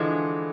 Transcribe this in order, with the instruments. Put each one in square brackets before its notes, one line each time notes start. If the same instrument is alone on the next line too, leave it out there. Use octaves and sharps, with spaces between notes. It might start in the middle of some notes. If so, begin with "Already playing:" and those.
Already playing: [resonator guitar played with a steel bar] D3 F3 G#3 [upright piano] E3